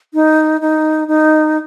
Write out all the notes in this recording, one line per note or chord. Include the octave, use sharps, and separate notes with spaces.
D#4
D#4
D#4